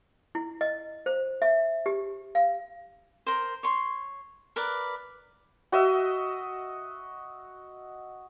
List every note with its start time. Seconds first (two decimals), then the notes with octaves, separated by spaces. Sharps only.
0.35 E4
0.61 D#5
1.06 C5
1.42 E5
1.86 G4
2.35 F5
3.27 A#4 C5
3.63 C#5 C6
4.56 A#4 B4 D5
5.72 F#4 D#5 E5